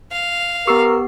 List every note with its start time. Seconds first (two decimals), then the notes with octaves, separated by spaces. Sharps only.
0.12 F5
0.67 B3 G4 A#4 C#6 E6 C7